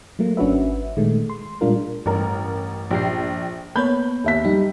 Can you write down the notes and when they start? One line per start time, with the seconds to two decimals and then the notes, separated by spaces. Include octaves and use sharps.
0.19 F#3 A3 A#3
0.37 G#1 C#4 D4 F#4 B4 E5
0.97 A#2 D#3 G#3 A3
1.30 C6
1.61 A#2 G3 G#3 D4 F4 A#4
2.06 A1 G2 A#4
2.91 A#1 G4 C7
3.76 A#3 B3 C#5 B5 G6
4.24 D#2 E5 B6
4.45 G3 D#4